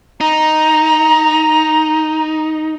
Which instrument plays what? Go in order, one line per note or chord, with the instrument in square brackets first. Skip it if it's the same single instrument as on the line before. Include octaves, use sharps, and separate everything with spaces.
[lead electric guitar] D#4 [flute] A#5